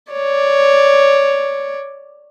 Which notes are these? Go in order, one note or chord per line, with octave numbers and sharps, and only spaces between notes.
C#5 D5